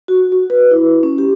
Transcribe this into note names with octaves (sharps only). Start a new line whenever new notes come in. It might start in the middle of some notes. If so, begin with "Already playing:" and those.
F#4
F#4
B4
E4
C#4
G4